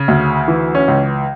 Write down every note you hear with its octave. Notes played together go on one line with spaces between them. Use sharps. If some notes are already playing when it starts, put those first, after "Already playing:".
Already playing: C#3
D2
E3
C#4
C#2